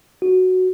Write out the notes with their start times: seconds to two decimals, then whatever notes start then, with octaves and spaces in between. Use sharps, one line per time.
0.22 F#4